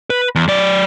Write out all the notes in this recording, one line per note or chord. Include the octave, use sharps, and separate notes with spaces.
B4
E2
F#3 D5